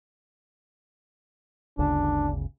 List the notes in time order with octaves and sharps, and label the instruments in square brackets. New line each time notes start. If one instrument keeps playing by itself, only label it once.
[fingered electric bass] G1 D2 C#3 [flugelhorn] D4